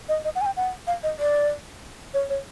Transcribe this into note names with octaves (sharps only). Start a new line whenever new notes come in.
D#5
D#5
F#5
G#5
G5
F#5
F5
D#5
D5
C#5
C#5